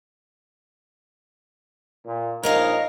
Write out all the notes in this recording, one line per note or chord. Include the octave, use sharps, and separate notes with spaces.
A#2
A#1 D#4 A#4 C#5 D#5 F5